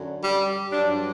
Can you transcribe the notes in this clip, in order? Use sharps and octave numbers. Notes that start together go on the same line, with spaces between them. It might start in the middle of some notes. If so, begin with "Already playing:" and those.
Already playing: F#2 D3
G3
G2 F#3 D4